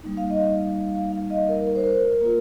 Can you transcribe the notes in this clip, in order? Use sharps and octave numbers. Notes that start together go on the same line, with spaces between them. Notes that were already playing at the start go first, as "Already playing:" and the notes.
G3 A#3 D#4
F5
D#5
F5
F5
D#5
A#4
A#4
C5
A#4
A#3 F4